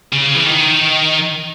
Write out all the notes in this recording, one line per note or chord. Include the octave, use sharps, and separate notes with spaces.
C#3
E3
D#3